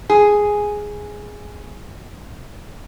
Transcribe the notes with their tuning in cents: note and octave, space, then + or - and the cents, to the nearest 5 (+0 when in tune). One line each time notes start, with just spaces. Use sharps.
G#4 +0